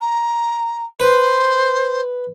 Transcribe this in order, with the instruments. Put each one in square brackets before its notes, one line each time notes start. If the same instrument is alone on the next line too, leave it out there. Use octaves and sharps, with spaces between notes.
[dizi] A#5
[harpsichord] B4 [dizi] C5